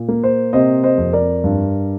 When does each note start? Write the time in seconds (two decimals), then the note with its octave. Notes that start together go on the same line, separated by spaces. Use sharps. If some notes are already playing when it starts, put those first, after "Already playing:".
Already playing: A#2
0.08 A#3
0.23 C5
0.53 C3 C5 D#5
0.83 C5 D#5
0.98 F2
1.13 A#4 D5
1.44 G2